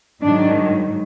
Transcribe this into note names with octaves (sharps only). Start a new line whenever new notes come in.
G#2 D#3 F#3 D4